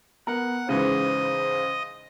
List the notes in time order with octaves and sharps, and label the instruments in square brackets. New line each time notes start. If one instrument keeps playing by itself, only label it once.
[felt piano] B3 [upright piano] A#4 [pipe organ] F#5
[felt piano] C#2 G#2 [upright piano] C#3 E3 [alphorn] C5 [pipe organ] D#5